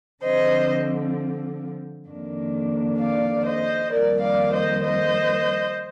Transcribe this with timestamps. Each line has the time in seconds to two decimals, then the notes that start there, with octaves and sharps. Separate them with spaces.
0.23 D3 F3 C4 C5 D#5
2.07 F2 D#3 A#3 D4
2.98 D5 F5
3.45 C5 D#5
3.91 F2 D#3 G3 A#3 A#4 D5
4.21 D5 F5
4.52 C5 D#5
4.83 C5 D#5